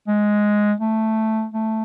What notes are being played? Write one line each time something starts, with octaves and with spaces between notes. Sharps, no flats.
G#3
A3
A3